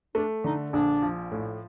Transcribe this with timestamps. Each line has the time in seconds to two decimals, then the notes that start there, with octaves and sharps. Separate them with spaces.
0.15 A3 D4
0.44 D3 D#4
0.73 A#1 D4
1.02 F3
1.32 A2